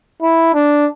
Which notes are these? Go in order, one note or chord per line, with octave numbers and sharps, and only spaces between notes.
E4
D4